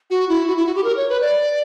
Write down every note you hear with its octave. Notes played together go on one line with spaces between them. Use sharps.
F#4
E4
F#4
E4
F#4
G4
A#4
C#5
B4
D5